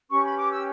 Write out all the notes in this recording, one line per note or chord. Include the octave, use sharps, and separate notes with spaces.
C#4 G4 B4 C#6
B5
D6
E6